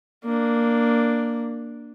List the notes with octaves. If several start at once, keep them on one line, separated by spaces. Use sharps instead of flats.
A#3 D4